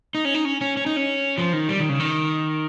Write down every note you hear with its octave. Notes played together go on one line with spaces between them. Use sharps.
D#4
C#4
D#4
C#4
C#4
C#4
D#4
C#4
F3
D#3
G3
D#3
C#3
D#3